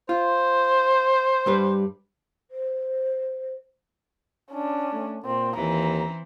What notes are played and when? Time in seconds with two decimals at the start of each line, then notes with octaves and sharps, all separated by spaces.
0.09 F4 C5
1.46 G2 G3 B4
2.50 C5
4.52 C#4 D4
4.93 A3
5.25 A#2 C4
5.55 D#2 E3 C4 A#5